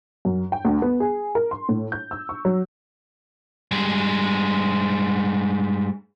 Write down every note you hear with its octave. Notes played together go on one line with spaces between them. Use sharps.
F#2
G5
D2
B3
G#4
A#4
C6
A2
G6
E6
C#6
F#3
G2 G#3